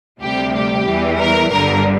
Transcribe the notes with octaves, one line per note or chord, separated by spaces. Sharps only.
D2 C3 G3 G4
G4
E2 E3 G3
A#4
G1 G2 D3 G3 A#4